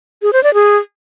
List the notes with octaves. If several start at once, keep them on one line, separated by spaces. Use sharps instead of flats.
G#4
C5
D5
G#4